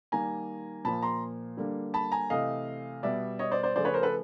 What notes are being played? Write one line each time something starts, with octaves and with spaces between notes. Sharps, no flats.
D#3 G3 A#3 G#5 A#5
A#2 F3 A#3 A5 B5
A#5 C6
D3 G3 A#3
A5 B5
G#5 A#5
C3 E3 A3 D#5 F5
B2 G3 B3 D5 E5
C#5 D#5
C5 D5
C5 D5
C#3 F3 A3 C5 D5
B4 C#5
A#4 C5
A4 B4